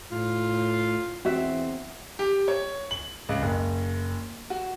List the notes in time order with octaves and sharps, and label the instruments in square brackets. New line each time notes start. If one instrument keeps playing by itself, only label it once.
[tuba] A2 [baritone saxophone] F4
[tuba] E2 [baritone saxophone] C4 [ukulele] F#4 E5
[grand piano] G4
C#5
F#7
C#2
F#1
F#4